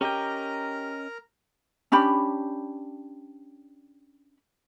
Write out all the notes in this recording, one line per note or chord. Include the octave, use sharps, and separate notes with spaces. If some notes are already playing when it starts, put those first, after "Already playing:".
C#4 G4 A#4 D#5 G5 A#5
C#4 D4 G4 B5